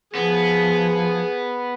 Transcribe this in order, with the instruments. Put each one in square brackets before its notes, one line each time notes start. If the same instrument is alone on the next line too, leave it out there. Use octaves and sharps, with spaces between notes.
[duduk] F3 [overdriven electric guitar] B3 [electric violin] G#4